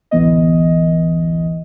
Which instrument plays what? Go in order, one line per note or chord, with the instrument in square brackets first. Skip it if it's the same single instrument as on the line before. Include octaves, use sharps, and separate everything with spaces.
[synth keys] A1 D2 E3 B3 D#5